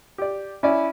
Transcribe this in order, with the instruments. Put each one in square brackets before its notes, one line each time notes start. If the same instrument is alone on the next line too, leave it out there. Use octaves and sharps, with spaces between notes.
[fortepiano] G4 D5
[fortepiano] C#4 D5 E5 [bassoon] E4